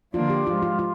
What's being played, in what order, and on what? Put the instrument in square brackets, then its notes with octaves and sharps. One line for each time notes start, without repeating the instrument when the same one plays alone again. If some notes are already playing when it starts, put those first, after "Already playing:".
[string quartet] D3 F3 A#3 D4 [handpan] F4
[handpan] G4
[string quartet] G#2 F3 G#3 [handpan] F4
[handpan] F4
F4